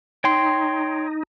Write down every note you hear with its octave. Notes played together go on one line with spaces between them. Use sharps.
D#4 C#5 G5 C6